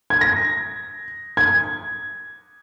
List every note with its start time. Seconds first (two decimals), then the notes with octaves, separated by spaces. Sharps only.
0.10 G#6
0.21 A#6
1.37 G#6